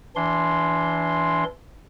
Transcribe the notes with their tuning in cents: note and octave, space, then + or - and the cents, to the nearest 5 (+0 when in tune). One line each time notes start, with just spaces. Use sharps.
E3 +5 D4 -25 C6 +0